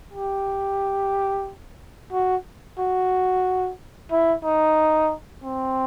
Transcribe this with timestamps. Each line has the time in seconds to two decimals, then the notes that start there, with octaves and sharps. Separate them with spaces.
0.13 G4
2.13 F#4
2.79 F#4
4.11 E4
4.44 D#4
5.44 C4